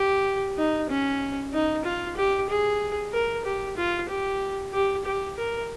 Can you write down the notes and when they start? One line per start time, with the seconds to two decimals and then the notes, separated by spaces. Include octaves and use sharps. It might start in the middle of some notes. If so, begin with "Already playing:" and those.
Already playing: G4
0.57 D#4
0.90 C#4
1.53 D#4
1.85 F4
2.17 G4
2.49 G#4
3.13 A#4
3.45 G4
3.77 F4
4.09 G4
4.73 G4
5.05 G4
5.37 A#4